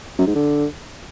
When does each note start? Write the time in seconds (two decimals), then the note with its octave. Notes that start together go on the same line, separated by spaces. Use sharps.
0.19 F#2
0.27 G#2
0.35 D3